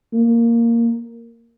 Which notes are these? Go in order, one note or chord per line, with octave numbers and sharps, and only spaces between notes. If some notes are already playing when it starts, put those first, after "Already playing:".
A#3